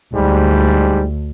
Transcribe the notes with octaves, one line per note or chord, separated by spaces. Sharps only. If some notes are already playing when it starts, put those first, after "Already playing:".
D2 G#2 G3